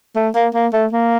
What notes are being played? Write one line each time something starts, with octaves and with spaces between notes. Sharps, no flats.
A3
A#3
A#3
A3
A#3